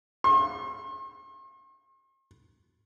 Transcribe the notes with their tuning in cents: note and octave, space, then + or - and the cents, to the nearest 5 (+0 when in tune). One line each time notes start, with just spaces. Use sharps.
C6 +45